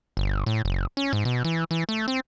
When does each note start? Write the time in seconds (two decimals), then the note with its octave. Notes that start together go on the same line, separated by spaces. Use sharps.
0.17 G1
0.46 A2
0.65 F#1
0.97 C#4
1.13 G#2
1.25 B2
1.45 E3
1.71 E3
1.89 A3
2.08 C4